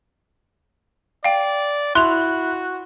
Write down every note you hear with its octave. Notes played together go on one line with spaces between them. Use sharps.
D5 F5 G5
E4 F#4 C6 F#6 F7